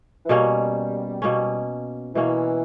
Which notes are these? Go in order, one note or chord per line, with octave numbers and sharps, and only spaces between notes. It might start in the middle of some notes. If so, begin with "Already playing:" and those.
E3
B2 G3 A#3 C#4
B2 A#3 C#4
B2 E3 A#3 C#4